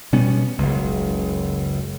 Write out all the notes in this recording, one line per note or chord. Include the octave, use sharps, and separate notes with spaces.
B2 G3 B3 C#4
F#1 C#2